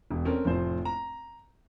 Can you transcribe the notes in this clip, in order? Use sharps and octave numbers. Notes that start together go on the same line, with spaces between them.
E1
C4 C#4 A4 A#4
F1 A2 F3 C5
A#5